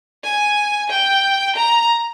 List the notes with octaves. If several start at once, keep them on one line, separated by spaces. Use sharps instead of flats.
G#5
G5
A#5